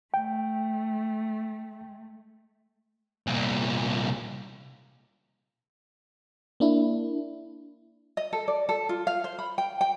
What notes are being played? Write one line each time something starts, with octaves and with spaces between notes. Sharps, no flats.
A3 G5
C2 A#2
A#3 D4 E4
D#5
A4
D5
A4
F4
F5
C5
B5
G5
G5